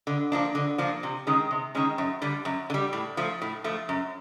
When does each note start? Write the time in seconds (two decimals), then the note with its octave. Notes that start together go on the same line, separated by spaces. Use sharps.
0.07 D3
0.32 F3 A#3 D4
0.55 D3
0.78 F3 A#3 D4
1.03 C3
1.27 D#3 G#3 C#4
1.51 C3
1.75 D#3 G#3 C#4
1.98 F#2
2.22 D3 G3
2.45 F#2
2.70 D3
2.74 G3
2.93 A2
3.17 F3 A3
3.42 A2
3.64 F3 A3
3.89 F#2